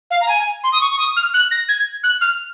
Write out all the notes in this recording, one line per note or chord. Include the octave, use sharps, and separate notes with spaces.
F5
A#5
G#5
C6
D#6
C#6
C#6
D#6
F6
F#6
A#6
G#6
F#6
F6